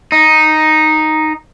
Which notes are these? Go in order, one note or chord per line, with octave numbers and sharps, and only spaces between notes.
D#4